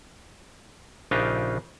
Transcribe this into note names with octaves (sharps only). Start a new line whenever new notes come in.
A#1 C#3 D4 D#4 F4 G4